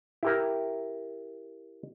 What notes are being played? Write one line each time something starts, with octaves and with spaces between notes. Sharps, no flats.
E4 G4 A#4